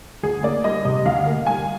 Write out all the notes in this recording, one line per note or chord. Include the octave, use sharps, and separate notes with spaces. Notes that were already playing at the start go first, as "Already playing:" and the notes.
D2 G#4
A#3 D5
G3 D#5
C3 D#5
D2 F5
A#3
G3 G#5